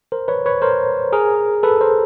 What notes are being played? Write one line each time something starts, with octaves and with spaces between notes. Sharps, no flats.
A#4 C5
B4 C#5
B4 C#5
A#4 C5
G#4 A#4
A4 B4
A#4 C5